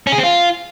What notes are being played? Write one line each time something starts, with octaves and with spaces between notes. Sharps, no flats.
C#4
G#4
C4
F4